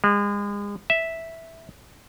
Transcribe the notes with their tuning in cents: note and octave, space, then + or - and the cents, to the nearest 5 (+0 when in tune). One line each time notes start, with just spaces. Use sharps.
G#3 -35
E5 -5